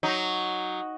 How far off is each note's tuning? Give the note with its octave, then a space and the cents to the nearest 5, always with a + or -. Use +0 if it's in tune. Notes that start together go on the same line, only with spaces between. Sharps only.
F#3 +0 D#4 +0